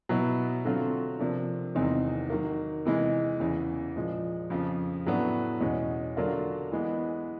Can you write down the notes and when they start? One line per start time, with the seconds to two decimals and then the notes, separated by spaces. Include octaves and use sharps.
0.09 B2 F#3 B3 E4
0.64 D3 F#3 A3 C4 F4
1.19 C3 F3 A#3 D4
1.75 E2 C3 D#3 G#3 C4
2.30 D#3 F#3 A#3
2.85 C3 E3 G#3
3.40 E2 C#3 E3
3.96 A#2 F3 G#3
4.50 F2 C#3 F3
5.06 A2 F#3 B3 D4
5.61 E2 B2 G#3 C#4
6.17 D3 F#3 A#3 D4 F4
6.72 E3 G#3 B3